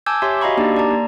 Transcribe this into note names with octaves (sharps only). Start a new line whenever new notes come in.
G#5 A5 D6 E6 G6 G#6
G4 C#5 E5 G#5 C6
F#4 D#5 F5 A#5 B5 C#6
A#3 D4 D#4 G4 D5
D5 A5 A#5
A#3